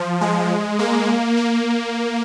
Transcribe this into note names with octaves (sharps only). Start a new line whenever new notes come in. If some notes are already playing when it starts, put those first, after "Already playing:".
Already playing: F3
G#3
A#3
A#3